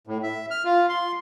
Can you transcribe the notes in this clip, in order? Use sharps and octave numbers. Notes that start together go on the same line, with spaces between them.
A2
E5
F6
F4
C6